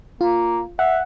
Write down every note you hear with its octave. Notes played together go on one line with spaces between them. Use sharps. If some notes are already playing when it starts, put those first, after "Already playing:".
A#3 F4
E5 F#5